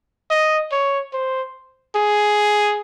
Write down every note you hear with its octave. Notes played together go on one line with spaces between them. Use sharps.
D#5
C#5
C5
G#4